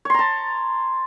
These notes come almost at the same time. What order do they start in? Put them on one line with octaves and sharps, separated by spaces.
C#5 C6 A#5 A5